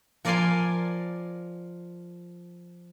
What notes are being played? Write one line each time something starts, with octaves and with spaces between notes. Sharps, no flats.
F3 A#4 D5 F5 G#5 C6